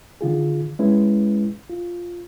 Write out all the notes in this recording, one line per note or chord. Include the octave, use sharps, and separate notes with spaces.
D3 D#3 F4 G#4
G#3 C#4 E4 B4
F4